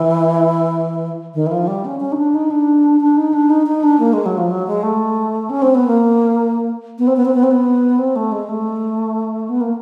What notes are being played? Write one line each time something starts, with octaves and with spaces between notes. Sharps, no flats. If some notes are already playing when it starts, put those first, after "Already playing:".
Already playing: E3
D#3
E3
F3
G3
C#4
C#4
D#4
D4
D#4
D4
D4
D#4
D4
D#4
D#4
D4
A#3
G#3
F#3
F3
F#3
G#3
A3
C#4
C4
B3
A#3
B3
C4
B3
C4
B3
C4
B3
C4
A3
G#3
A3
B3
A#3